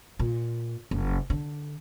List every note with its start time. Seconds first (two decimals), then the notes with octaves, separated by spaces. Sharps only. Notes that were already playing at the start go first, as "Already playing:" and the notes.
0.19 A#2
0.91 F#1
1.30 D3